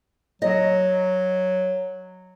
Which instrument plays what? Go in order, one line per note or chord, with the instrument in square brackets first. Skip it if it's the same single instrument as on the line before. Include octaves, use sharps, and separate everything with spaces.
[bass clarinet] F#3 [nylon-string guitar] D#5